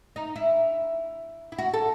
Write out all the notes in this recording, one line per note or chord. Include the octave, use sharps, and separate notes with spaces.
D#4
E4
E4
F#4
A4